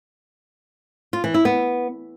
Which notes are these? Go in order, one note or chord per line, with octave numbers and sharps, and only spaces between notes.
F4
E3
E4
B3